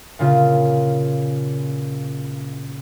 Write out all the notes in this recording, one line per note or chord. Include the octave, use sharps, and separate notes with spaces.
A#2 C#3 F4